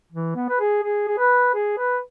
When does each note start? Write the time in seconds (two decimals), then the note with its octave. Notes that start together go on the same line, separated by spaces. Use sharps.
0.12 E3
0.35 B3
0.49 B4
0.60 G#4
0.83 G#4
1.08 G#4
1.18 B4
1.54 G#4
1.78 B4